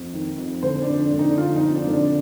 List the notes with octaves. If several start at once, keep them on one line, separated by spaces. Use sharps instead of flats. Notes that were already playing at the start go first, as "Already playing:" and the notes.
Already playing: F2
D#3
F2
D3 C5
D4
F2
D4
D3
D#4
F2 F4
D#4
F2
D4
D3
D4